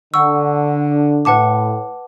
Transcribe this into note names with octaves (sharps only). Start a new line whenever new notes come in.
D3 F#5 C#6 E6
A2 B4 F#5 A5 D6